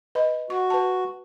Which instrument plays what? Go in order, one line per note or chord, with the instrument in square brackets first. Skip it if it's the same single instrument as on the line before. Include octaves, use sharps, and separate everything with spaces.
[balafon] B4 D#5 B5
[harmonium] F#4 [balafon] C#6
[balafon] B4 A5